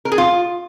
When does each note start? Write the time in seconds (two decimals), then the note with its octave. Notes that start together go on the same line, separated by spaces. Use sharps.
0.05 A#4
0.12 G#4
0.18 F4